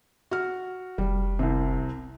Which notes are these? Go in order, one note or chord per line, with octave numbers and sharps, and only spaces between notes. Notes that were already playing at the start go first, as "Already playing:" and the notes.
F#4 F6
F1 G3
C2 C3